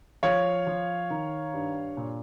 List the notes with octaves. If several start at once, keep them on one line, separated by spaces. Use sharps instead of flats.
F3 C#5 F5
F3
D#3
G2
A#2